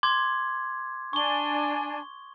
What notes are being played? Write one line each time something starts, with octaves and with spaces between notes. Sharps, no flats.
C6 D6 G#6
D4 G#5 C#6 G7